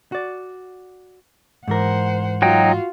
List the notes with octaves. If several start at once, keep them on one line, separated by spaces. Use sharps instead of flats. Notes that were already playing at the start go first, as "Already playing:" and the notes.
F#4 D5
G#2 E3 A#4 C5 F#5
F#3 D#4 F4 F#4 G5